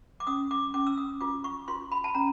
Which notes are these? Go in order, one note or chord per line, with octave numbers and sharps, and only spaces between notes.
D6
C#4 D#6
D6
C#4 D6
E6
D#6
F4 D6
C#6
F4 C6
B5
A5
C#4 A#5